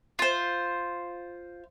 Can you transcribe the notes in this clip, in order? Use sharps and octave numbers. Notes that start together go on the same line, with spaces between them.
F4 C5